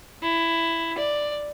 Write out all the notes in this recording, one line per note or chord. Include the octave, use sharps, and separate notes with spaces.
E4
D5